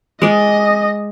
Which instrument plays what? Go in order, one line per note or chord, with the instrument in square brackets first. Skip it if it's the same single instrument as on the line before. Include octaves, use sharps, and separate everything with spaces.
[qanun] G#3 D5 [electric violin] D#5